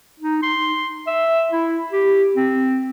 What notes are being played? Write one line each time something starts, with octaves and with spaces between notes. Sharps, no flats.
D#4
C6
E5
E4
G4
C4